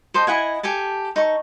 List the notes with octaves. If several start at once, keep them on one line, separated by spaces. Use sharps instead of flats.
A4 C5 D#5 G5
E4 D#5 F#5 G#5
G4 A4 G#5 A5
D#4 A4 C#6